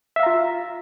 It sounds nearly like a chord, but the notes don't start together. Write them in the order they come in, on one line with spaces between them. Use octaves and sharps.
E5 F5 A#5 F4